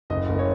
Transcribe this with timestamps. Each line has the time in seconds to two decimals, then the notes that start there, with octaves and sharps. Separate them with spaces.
0.10 F#1 D#5
0.29 F#1
0.39 C#5